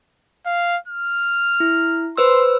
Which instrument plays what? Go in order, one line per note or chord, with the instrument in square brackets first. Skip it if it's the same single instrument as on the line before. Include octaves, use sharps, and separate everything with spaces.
[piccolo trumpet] F5
F6
[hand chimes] E4
[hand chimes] B4 C5 E6 [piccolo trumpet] C6